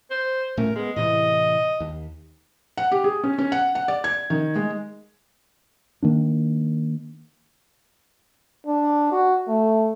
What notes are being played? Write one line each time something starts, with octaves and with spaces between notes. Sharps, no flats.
C5
A2 A3 C#4 A#4
G#3 B3
A2 C3 E3 D#5
D#2
F#5
G4
G#4
C#4
C#4
F#5
F#5
D5
G#6
D#3
G#3
D#3 A#3 D4
D4
F#4
A3